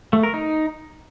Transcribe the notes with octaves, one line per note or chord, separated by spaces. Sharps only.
A3
A#4
D#4